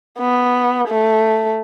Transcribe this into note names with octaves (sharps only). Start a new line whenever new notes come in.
B3
A3